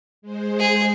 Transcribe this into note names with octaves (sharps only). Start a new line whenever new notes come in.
G#3 C5
G#4